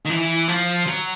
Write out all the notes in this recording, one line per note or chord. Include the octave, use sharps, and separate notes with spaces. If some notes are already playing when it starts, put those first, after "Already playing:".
D#3
E3
F3
F#3